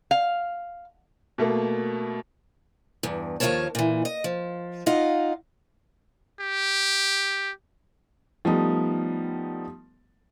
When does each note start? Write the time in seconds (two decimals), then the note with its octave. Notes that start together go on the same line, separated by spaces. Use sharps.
0.11 F5
1.38 B2 A3 A#3
3.03 E2 G2
3.40 D#2 F3 G#3 A#4 C#5 A5
3.75 A#2 E3
4.05 D#5
4.24 F3
4.86 D#4 F4 D#5 F5 F#5
6.40 G4
8.45 F3 G3 A3 B3 D#4